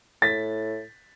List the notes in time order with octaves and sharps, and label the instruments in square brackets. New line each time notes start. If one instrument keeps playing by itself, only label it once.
[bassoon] A2 [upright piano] A6 B6